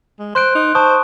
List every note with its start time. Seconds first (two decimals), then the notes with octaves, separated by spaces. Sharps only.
0.19 G#3
0.35 C5 C6 F#6 D7
0.55 D#4
0.75 C5 A5 C#6 D#6